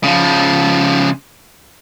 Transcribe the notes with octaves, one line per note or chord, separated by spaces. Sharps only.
C#3 F3